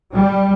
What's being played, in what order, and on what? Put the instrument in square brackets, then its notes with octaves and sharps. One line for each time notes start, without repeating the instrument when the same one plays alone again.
[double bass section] G3